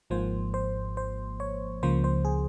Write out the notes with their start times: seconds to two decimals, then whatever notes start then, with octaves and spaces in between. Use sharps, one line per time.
0.10 G#1 G#2 F3 A#3 C5
0.54 C5
0.97 C5
1.40 C#5
1.83 C#2 C#3 F3 A#3 C5
2.04 C5
2.25 G#4